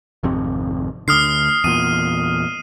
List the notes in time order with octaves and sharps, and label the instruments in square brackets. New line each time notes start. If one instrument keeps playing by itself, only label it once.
[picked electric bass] G#1 F2 C3
[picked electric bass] D2 D3 [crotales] D#6 F6 C7
[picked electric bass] E2 A#2 [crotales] D#7